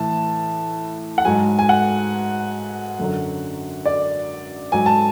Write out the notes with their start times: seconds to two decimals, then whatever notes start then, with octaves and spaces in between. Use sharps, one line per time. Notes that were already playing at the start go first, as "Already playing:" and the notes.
Already playing: A2 E3 A5
1.18 F#5
1.25 G#2 F#3 G#5
1.59 G#5
1.69 F#5
2.99 F#2 D3 F#3
3.86 D5
4.72 G#2 F#3 G#5
4.86 A5